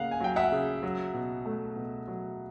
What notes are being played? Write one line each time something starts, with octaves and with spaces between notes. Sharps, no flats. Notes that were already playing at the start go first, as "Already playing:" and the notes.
Already playing: C#3 A#3 F5 F#5
G#5
F#3 G5
E5 F#5
C#3
F#3
B2
A3
B2
F#3